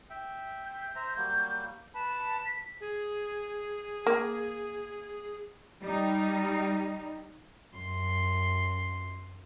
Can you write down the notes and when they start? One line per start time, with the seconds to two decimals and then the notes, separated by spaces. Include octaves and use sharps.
0.10 E5 G5
0.65 G6
0.96 C5 E5 A#5
1.17 F#3 G3 A#3
1.94 B4 A5 B5
2.45 B6
2.81 G#4
4.07 A#3
5.84 G3 D#4
7.76 F#2 C6